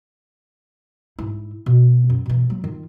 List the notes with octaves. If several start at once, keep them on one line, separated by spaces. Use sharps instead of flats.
G#2 E4
B2
F#2
B2 E3
F#3 A#3
D#3 F4